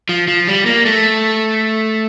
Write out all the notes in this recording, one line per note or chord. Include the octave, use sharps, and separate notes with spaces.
F3
F3
G3
A#3
A3